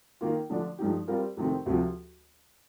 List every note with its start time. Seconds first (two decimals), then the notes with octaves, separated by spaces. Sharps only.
0.21 D#3 A#3 F4
0.50 D3 F3 A3 D4
0.79 G2 F3 A3 D#4 G4
1.07 G3 C4 F4 A#4
1.37 F2 C3 D#3 A3 C4
1.66 D2 C3 F3